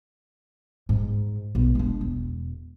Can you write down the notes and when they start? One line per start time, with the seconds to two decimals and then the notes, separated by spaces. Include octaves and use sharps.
0.89 G#2
1.55 B1
1.75 G#3 D4
2.01 E1